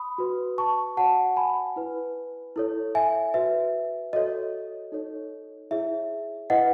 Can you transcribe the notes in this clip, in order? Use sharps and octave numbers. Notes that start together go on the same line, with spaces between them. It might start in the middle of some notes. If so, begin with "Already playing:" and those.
Already playing: B5 D#6
F#4 B4
A5 C#6
F#4 C#5 F#5 A5
G#5 B5
E4 B4
E4 A4 C#5
E5 G#5
F#4 B4 E5
F#4 A4 C#5 D#5
D#4 A4 C#5
E4 G#4 C#5 E5
E4 B4 D#5 F#5